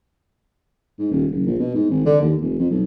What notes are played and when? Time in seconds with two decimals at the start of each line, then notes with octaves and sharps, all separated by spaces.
0.99 G#2
1.11 D#1
1.31 F#1
1.46 A#1
1.58 B2
1.74 G#2
1.90 G#1
2.05 D3
2.21 D#2
2.41 F1
2.59 F2
2.71 B1